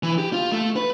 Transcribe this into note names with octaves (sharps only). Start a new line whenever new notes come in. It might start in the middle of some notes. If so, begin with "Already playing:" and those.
E3
G4
F4
A3
B4